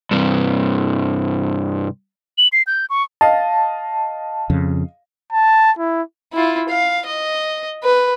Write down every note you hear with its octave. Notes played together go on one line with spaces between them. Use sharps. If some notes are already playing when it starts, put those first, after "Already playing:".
G2 C3
F#7
C7
G6
C#6
D#5 F5 A5
F2 C#3
A5
E4
E4 F4
F5
D#5
B4